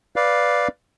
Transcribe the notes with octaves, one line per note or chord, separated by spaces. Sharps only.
B4 D5 F5